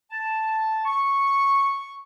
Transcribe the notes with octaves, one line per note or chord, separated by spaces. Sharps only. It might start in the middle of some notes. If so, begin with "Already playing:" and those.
A5
C#6